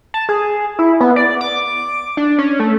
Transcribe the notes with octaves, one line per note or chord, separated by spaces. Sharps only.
A5
G#4
E4
B3
D5
D6
D4
C#4
A3